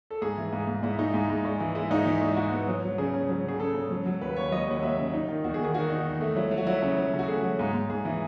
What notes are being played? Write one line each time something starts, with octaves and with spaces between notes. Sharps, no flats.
A4
G#2 G#4
E3
G#2
G#2
G#2 E4
G#3 D#4
G#2
G#2
G#3
E3
G#3 E4
G#2 D#4
E3 E4
G#3
E4
G#2 F#4
B3
F#3
F#3
C#3 G#4
C#3
F#3
C#3 G#4
C#3 A4
C#3
F#3
F#3
D#2 B4
D#2 C#5
F#3 D#5
D#2 F#5
F#3 E5
C#3
D#4
D#3
E2 F#4
G#4
D#3
G#4
D#3 F#4
D#4
E2
A3
F#3 E4
F#3
F#4
F#3 E4
C#3
F#3
C#3
F#4
A3 G#4
F#3
G#2
G#2
G#2 G#4
E3